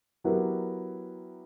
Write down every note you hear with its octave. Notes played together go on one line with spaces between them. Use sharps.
F#3 B3 E4 G4 A#4